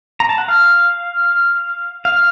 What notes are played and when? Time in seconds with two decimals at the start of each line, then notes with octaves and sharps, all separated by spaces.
0.20 A#5
0.29 A5
0.38 F#5
0.49 F5
2.05 F5